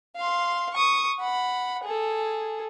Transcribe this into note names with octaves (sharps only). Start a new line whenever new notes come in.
F5 C6
C#6 D#6
F#5 B5
G#4 A4